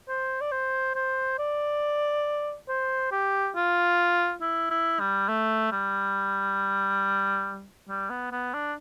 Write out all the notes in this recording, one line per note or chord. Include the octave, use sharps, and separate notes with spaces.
C5
D5
C5
C5
D5
C5
G4
F4
E4
E4
G3
A3
G3
G3
B3
B3
D4